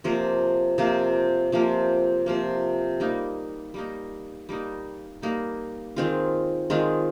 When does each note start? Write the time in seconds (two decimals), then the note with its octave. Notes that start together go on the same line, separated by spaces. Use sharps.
0.04 C3 F3 A#3
0.78 C3 F3 A#3
1.52 C3 F3 A#3
2.26 C3 F3 A#3
3.00 G3 A#3 D#4
3.74 G3 A#3 D#4
4.49 G3 A#3 D#4
5.22 G3 A#3 D#4
5.96 D#3 G#3 C4 F4
6.70 D#3 G#3 C4 F4